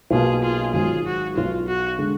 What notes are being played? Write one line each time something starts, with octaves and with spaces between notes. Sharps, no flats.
B1 B2 A#3 F4 G#4
F4 G#4
G#1 G#2 D#3 F#3 F4 G#4
F#4
B1 B2 F#3 F4
F#4
D3 G#3